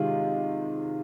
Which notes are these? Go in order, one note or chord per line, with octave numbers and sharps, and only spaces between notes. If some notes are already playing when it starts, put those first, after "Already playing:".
Already playing: C3 D#3 G#3 F4